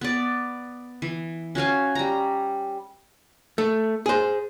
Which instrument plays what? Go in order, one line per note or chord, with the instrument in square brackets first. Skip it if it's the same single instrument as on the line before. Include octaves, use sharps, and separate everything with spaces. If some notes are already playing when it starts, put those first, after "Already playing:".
[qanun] B3 D5
E3
C#4 F#4 F5 G#5
G3 A#5
[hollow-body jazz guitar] A3
G#4 C5